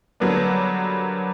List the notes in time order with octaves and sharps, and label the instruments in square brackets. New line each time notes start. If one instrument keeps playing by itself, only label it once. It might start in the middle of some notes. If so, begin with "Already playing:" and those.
[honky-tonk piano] D3 F#3 G3 A#3 B3 D4